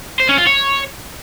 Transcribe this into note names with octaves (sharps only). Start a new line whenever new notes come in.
C5
C#4
F4
C#5